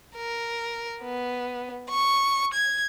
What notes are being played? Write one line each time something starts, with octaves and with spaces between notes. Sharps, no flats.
A#4
B3
C#6
G#6